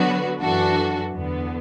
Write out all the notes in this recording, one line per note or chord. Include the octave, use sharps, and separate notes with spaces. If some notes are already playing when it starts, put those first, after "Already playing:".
Already playing: D3 F#3 B3 F#4 B4
F#2 E3 D4 F#4 A4
E2 D3 B3